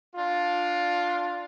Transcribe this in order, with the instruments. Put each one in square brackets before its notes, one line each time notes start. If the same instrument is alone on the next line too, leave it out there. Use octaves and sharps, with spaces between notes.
[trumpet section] D4 F4